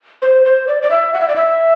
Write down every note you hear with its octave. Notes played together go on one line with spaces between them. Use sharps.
C5
C5
D5
D5
E5
F#5
E5
D5
E5